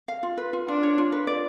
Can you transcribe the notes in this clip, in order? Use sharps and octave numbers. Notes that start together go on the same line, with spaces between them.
F5
F4
B4
F4
D4 F4
C#5
F4
B4
D5